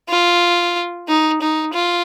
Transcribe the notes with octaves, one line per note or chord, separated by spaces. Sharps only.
F4
D#4
D#4
F4